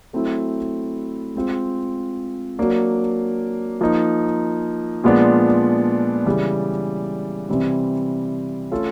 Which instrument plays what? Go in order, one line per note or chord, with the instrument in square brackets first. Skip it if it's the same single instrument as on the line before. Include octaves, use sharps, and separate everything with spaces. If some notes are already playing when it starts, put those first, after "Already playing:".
[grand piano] F#3 A3 C4 E4
G#3 C4 F4
F#3 A#3 D4
F3 A#3 D#4
A#2 F3 G#3 B3 D4
C#3 E3 G3
C3 E3 G3 C4
A3 C#4 F4 A4